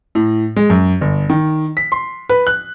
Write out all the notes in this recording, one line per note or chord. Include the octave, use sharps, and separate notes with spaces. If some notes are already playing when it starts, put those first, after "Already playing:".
A2
G#3
F#2
G1
D#3
B6
C6
B4
F#6